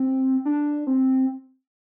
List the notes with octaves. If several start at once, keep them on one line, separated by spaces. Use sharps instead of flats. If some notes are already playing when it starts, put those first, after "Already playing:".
Already playing: C4
D4
C4